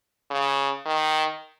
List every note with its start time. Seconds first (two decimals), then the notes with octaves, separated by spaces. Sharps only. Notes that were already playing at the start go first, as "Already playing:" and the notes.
0.31 C#3
0.86 D#3